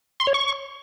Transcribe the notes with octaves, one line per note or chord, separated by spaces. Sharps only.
C6
C#5
C#6